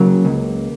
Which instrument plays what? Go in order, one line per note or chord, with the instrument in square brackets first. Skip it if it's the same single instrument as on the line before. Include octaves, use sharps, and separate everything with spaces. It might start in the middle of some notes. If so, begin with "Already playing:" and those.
Already playing: [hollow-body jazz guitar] C#3 F#3 [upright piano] A#3
[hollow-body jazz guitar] C#2